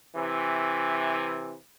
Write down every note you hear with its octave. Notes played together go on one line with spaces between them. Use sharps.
C3 E3